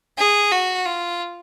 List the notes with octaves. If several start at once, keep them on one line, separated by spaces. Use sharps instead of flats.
G#4
F#4
F4